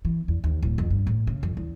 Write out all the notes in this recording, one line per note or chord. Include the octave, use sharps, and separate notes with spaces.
E3
E2
D#2
D1
F2
G2
A2
C#3
F2
E2